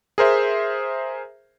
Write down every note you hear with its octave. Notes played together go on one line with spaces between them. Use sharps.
G#4 A#4 C5 E5